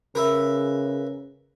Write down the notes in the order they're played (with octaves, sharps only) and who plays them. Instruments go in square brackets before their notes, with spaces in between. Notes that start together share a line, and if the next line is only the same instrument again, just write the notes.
[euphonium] C#3 [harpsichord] A#4 B4 E5